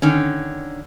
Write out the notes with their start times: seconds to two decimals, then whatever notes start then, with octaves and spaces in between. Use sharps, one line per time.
0.02 D3 D#3 C#4